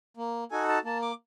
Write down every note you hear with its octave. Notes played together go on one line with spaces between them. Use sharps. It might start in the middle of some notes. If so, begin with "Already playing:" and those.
A#3
D#4 F#4 A4 G#5
A5
A#3 A5
D6